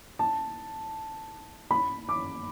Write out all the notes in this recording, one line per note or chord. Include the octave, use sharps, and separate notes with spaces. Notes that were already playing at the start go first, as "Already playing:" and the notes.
A5
B5
D6